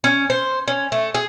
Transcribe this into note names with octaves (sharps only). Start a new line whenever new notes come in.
C#4
C5
C#4
A3
G#4